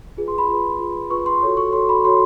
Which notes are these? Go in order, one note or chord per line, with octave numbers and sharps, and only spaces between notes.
F4 G#4 B4
C6
B5
F4 G#4 B4
F4 G#4 B4
F4 G#4 B4 C#6
C6
F#4 A4 C#5
C#6
F#4 A4 C#5 C6
B5
F#4 A4 C#5 C6